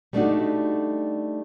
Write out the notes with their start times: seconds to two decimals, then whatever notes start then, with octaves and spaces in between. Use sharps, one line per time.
0.13 G3 A3 B3 D4 D#4 F#4